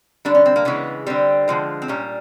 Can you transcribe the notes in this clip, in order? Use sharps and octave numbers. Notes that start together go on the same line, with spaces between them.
D3 G3 D4
C#4
C4
A#3
C#3 E3 G#3 B3
D3 G3 C4
D3 F3 G#3
C4
A#2 G3 C#4